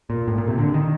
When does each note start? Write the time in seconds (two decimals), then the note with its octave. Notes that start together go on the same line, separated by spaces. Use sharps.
0.10 A#2
0.28 A2
0.38 A#2
0.48 C3
0.58 D3
0.74 D#3